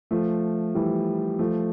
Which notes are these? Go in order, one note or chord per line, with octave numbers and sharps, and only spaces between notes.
F3 A3
E3 G3
F3 A3